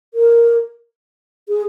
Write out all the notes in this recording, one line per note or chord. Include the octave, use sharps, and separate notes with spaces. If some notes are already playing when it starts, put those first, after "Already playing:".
A#4
G#4